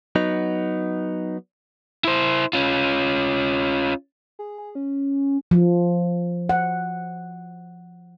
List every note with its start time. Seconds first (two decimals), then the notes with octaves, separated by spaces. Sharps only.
0.15 F#3 B3 D#4
2.04 E4 C5
2.53 C#4 F4
4.39 G#4
4.58 G#4
4.75 C#4
5.51 F3
6.49 F#5